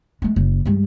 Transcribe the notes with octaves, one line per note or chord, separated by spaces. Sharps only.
G#3 A3
F#1
G2 G#3